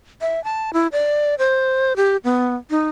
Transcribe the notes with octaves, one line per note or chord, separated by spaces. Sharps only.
E5
A5
E4
D5
C5
G4
B3
D#4